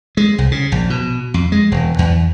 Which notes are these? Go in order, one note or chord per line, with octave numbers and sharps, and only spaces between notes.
G#3
C2
C#3
A#1
B2
F2
G#3
E1
E2